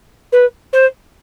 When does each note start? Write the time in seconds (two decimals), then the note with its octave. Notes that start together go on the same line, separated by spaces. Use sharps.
0.32 B4
0.73 C5